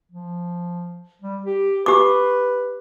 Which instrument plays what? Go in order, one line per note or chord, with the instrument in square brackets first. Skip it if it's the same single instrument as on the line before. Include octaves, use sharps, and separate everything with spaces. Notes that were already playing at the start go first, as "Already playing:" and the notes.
[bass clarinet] F3
G3
G4
[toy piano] G4 D6 [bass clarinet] B4